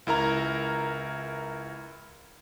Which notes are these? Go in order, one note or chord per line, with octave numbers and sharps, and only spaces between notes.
C#2 E4 A#4 A#5